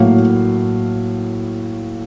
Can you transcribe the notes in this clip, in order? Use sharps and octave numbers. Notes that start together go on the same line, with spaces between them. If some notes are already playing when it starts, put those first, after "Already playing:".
Already playing: A2 F#3 A#3 F5